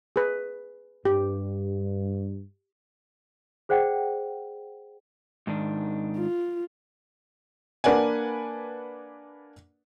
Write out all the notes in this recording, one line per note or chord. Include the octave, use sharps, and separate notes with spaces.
G#4 B4
G2 G4
G#4 C5 D5 F#5 G5
G#2 D#3 D4
F4
A#3 D4 B4 D5 F#5 G#5